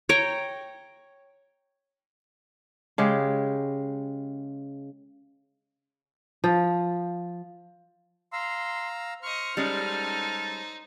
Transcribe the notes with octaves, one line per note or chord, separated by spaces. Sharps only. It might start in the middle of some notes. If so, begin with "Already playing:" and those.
C#5 G5 A#5
C#3 G#3 G4
F3
F5 A#5 C6 E6
C5 D#5 C#6 F6
G3 G#3 C#4 D#4 A4 C5